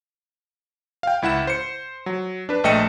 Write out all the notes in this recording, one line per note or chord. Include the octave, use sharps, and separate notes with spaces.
F5 G5
C#2 E4 F#5 E7
C5 C#7
F#3
D4 B4
A#1 A3 D#5 G5 C#7 E7